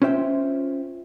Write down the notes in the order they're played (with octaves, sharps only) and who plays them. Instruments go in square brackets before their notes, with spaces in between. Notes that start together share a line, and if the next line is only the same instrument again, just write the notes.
[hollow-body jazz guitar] C#4 F4 C5 E5 G5